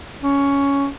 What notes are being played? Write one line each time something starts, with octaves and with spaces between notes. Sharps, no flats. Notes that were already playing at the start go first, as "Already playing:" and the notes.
C#4